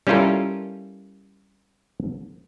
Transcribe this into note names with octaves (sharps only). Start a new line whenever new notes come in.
G3 C#4 E4 F4 A4 A#4